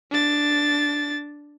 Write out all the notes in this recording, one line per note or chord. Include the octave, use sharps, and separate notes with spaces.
D4 A6